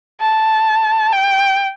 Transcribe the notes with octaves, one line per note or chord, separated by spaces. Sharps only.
A5
G5